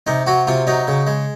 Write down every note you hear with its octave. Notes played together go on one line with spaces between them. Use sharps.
C3 D#4
F#3 F#4
C3 F4
F#3 D#4
C#3
G#3